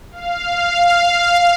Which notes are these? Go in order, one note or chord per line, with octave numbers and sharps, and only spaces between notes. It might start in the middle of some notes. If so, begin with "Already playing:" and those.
F5